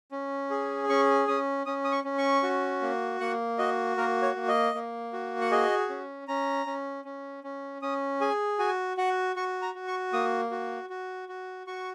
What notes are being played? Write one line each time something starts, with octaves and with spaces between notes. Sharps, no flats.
C#4
G#4
C#4 C#6
C#4 D#6
C#4 D#6
D#6
C#6
C#4
C#6
F#4
A#3
A#3 F#5
F#4 D#5
A#3 A#4
C#5
A#3
D#5
A#3
F#4
F#5
G#4 D#5
C#4
C#4 A#5
C#4
C#4
C#4
C#4 D#6
G#4 G#5
F#4 G#5
F#4 F#5
F#4 C#6
A#5
F#4
C#6
A#3 D#6
F#4
F#4
F#4
F#4 C#6